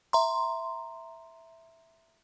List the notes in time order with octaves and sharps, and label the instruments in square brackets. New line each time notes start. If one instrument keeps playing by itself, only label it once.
[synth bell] E5 A#5 C6